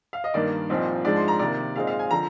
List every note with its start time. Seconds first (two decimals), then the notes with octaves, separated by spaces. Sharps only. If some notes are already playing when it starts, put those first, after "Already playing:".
0.13 F5
0.24 D#5
0.34 G2 D#3 A#3 D5
0.69 C2 A#2 F3 C4 D#4
1.04 G#2 F3 G#3 D4 D5
1.16 C6
1.28 A#5
1.39 C3 D#3 A#3 D5
1.75 A#2 G#3 C4 D#4 F5
1.87 F5
1.99 G#5
2.11 D3 F3 A#5